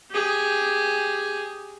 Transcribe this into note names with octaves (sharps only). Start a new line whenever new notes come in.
G4 G#4